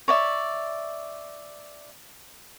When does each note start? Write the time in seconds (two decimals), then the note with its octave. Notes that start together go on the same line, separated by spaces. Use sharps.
0.08 C#5 D5 E5